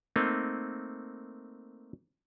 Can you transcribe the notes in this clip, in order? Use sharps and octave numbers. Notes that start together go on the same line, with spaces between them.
A3 A#3 C4 D#4